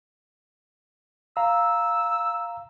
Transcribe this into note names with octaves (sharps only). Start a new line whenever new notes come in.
F5 A#5 E6